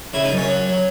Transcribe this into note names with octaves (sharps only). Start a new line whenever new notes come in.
C#3 E4
D#4
F#2
C#4
F#3
F#3